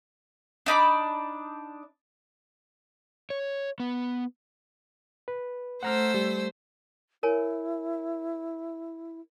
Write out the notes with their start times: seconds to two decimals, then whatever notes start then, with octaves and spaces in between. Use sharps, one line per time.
0.66 D4 D#4 B5 D6
3.30 C#5
3.80 B3
5.28 B4
5.83 A3 C5 F#5 A#5 E6 F6
6.14 G3
7.23 E4 A#4 C#5 G#5